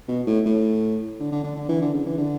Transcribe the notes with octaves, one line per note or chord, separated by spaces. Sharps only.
B2
A2
A2
D3
D3
D3
D3
E3
D3
C#3
E3
D3